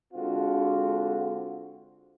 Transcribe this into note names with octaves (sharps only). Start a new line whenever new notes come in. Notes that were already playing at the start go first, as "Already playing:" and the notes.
D3 G#3 C4 F4 F#4